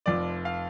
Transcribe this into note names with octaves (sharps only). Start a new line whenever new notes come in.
F1 F2 F3 D5
F5